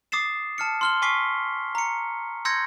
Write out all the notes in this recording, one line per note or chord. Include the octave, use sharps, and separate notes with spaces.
D6 D#6 A6 C7 E7
A5 F6 C#7
C6 F6 G7
G#5 C#6 D6 B6 C7 G7
A#5 C#7
C6 E6 G6 G#6 A#6 C#7